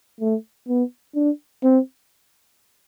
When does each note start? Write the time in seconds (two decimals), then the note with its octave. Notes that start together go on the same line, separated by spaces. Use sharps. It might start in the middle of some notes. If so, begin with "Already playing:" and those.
0.20 A3
0.68 B3
1.15 D4
1.64 C4